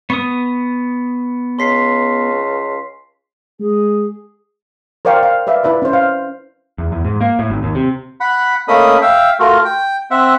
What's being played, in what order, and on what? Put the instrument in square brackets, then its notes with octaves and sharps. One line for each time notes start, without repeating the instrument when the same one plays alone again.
[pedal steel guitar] B3 D#6 [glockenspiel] C#6
[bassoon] C#2 [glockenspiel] C6 B6 C7
[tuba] G#3 [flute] G#4
[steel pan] A#4 C5 D5 F5 G5 C#6
F5
B4 D5 E5 F5
E4 B4 D5 E5 C6
C#4 C5
F5
[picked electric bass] E2
E2
G#2
A#3
A2
G#1
D#2
C3
[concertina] F#5 B5
A3 A#3 C#4 D#5 B5 D#6
E5 F5 G5
A3 F4 F#4 A#4
G5
C4 E5 F#5